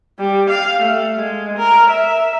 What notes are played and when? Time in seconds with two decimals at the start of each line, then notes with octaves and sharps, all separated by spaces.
0.19 G3
0.49 F5
0.81 A3
1.19 G#3
1.57 A#4
1.90 E5